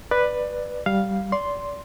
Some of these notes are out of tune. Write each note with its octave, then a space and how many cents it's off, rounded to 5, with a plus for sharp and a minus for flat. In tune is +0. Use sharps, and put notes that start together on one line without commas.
B4 +0 D5 +15
G3 -10 F5 +0
D5 -30 C6 +0